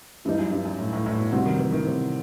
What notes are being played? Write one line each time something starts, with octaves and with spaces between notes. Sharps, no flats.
G2 E3 G3 D#4
F#2
G2
F#2
A2
A2
A2
B2
C3 G3 C4 F#4
D#3
E3
D#3
C3